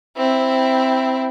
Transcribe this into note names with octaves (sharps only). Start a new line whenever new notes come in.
C4 E4